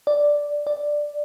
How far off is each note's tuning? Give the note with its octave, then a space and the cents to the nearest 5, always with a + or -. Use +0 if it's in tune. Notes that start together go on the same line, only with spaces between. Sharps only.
D5 +0
D5 +5